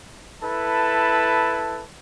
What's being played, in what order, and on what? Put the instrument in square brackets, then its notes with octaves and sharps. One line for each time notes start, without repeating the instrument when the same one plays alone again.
[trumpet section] E4 A4 B4 A5